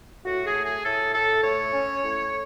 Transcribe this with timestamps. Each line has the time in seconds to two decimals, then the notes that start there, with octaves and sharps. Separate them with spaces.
0.25 A2 F#4
0.45 G#4
0.55 A3
0.64 G#4
0.84 A2 A4
1.14 A2 A4
1.43 A2 C#5
1.73 C#4
2.03 A2